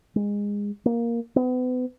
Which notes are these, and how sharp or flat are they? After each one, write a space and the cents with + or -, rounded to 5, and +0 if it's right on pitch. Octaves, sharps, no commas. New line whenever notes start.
G#3 -20
A#3 +5
B3 +35